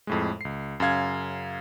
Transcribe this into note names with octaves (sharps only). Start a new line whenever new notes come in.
F2 A2 G#3
C#2 C7
F#2 C#3 F5 G#6